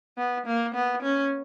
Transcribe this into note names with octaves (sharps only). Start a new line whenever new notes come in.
B3
A#3
B3
C#4